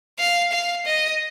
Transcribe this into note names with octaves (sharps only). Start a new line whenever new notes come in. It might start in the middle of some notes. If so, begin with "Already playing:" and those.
F5
F5
D#5